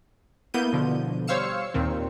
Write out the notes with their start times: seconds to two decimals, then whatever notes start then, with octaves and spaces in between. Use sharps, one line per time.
0.54 A#3 B3 E4 G6 D#7
0.73 B2 D3 F3
1.28 G3 C5 C#5 F5 E6 C#7
1.74 D#2 A#2 D#3 C4